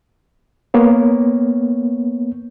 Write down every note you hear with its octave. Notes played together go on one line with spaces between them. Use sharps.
A#3 B3 C#5